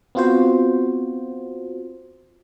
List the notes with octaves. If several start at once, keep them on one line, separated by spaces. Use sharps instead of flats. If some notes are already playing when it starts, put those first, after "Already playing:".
B3 C4 F4 F#4 C5